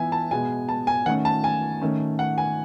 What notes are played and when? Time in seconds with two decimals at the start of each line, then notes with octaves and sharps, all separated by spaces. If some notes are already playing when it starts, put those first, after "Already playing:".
Already playing: E3 B3 E5 G#5
0.12 A5
0.31 B2 G#3 B3 G#5
0.69 A5
0.87 G#5
1.06 D#3 A3 C#4 F#5
1.25 A5
1.44 G#5
1.82 D#3 A3 C#4
2.19 F#5
2.38 G#5